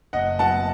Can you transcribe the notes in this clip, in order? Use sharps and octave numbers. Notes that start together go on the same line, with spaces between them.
F#1 D#5 F#5
F#2 F#3 B3 F#5 A5